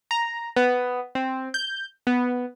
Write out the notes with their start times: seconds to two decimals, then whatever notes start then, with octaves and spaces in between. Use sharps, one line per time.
0.11 A#5
0.56 B3
1.15 C4
1.54 G6
2.07 B3